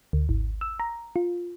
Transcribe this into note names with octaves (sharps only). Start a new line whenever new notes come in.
D2
G#1
E6
A#5
F4